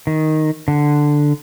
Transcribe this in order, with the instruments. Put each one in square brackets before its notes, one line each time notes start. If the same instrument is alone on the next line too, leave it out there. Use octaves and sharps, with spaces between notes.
[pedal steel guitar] D#3
D3